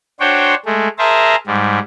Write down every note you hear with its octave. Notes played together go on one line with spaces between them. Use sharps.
D4 F#4 C5 C#5 G5
G#3 A3
G#4 A#4 C5 E5 A5 A#5
G#2 G3